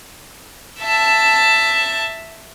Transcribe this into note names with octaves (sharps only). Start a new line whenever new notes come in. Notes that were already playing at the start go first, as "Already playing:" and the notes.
E5 A5